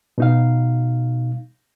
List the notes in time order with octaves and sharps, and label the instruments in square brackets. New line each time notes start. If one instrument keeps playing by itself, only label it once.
[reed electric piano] B2 D#4 F5